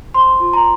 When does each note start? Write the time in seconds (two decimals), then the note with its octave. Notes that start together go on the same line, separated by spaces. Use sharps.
0.14 C5 C6
0.40 F4
0.53 A#5